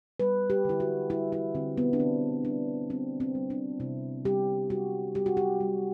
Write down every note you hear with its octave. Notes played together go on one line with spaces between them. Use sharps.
G3 B4
G4
D3 E4
F#4
G3 E4
E4
D3 C4
B3
D4
D3 C4
G3 D4
G3 C4
C4
G3
D4
C3 E4
G3 G4
G3 F#4
G3 G4
F#4
G4
G3